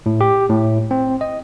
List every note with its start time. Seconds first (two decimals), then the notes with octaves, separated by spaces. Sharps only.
0.06 A2
0.21 G4
0.49 A2
0.91 C4
1.21 D#5